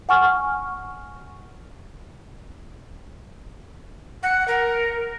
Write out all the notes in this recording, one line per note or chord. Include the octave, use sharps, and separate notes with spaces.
F#5 G#5 C#6 F6
F#5
A#4